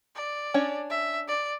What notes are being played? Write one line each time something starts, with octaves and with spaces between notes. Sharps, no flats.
D5
C#4 D4 C#5
E5
D5